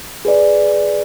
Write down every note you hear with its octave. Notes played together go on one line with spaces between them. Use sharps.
G#4 B4 D5